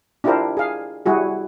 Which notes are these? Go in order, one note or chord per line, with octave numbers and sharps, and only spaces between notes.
D4 E4 F4 G4 A#4 C5
G#4 F5
G3 E4 F#4 G#4